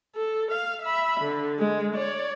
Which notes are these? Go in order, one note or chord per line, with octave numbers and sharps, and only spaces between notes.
A4
F5
E5 B5
D3
G#3
C#5 D5